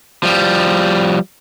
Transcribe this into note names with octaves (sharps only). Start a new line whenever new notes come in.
F3 G3